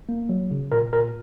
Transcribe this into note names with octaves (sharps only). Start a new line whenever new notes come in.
A#3
F#3
C#3
A#2 A#4
A#2 A#4